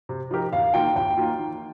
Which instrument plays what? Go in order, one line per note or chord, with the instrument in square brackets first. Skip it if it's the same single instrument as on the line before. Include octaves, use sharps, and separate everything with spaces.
[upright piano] C3
F3 D#4 G4 A#4
[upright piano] D#2 [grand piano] F5
[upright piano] D#3 A#3 F4 [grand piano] G5
[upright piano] D#2 [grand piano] G5
[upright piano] D#3 A#3 F4
D#3